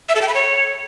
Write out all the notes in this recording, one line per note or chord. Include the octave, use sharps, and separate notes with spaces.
E5
A4
G5
B5
C#5